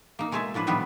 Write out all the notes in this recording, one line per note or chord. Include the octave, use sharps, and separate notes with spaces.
A#3 D#4
B2 G#3 A3 C#5 E5 A5
A2 F3 D4 B4
A#2 D#3 F3 G3 B3 B4